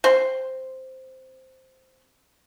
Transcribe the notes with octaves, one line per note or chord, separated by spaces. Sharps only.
C4 C6